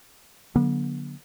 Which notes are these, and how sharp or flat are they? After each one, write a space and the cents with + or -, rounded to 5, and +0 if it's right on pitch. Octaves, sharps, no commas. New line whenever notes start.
D3 +0 F#3 -20 B3 -40